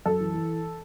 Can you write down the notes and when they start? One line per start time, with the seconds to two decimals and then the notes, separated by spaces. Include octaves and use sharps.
0.06 F#2 A4
0.20 E3
0.34 E3